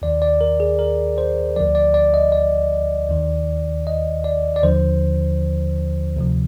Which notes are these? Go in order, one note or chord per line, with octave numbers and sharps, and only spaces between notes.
D#2 D#3 D5
D5
A#4
G#4
A#4
C5
D2 D3 F3 D5
D5
D5
D#5
D5
D#2 D#3
D#5
D5
D5
D#2 D3 F3 C5
D2 C3 F3